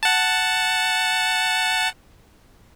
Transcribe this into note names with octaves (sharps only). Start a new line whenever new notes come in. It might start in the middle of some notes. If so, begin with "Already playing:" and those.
F#5 A5